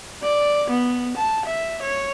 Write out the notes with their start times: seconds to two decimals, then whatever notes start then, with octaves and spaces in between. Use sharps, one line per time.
0.22 D5
0.70 B3
1.17 A5
1.46 E5
1.82 C#5